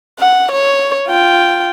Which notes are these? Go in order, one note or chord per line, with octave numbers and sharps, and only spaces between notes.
F#5
C#5
F4 G5